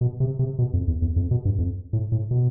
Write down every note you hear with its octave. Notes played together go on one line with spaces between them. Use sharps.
B2
C3
C3
B2
F2
E2
E2
F2
B2
G2
F2
A2
A2
B2